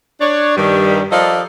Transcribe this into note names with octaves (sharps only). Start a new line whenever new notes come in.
D4 C#5 D5
G2 D#3 G3
F3 A4 A#4 D5 D#5 F5